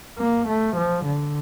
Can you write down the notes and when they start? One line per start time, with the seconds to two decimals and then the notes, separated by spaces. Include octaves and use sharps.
0.19 A#3
0.48 A3
0.77 F3
1.06 D3